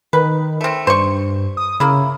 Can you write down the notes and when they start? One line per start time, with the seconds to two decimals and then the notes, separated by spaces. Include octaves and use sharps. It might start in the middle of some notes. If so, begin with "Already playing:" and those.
0.13 D#3 B4
0.61 A3 C4
0.87 G2 C5 C#6
1.57 D#6
1.80 C#3 A#3 E4